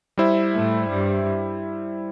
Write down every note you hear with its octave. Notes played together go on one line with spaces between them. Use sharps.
G3 E4 C5 E5
A2 A3
G2 G3